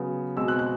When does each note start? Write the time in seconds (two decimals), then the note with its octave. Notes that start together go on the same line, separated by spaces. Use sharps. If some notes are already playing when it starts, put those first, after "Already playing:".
Already playing: C#3 F#3 B3
0.37 B2 G#3 C4 E6
0.48 F#6
0.59 F#6